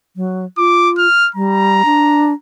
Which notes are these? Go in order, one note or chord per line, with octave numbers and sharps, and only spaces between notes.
F#3
F4 D6
F6
G3 A#5
D4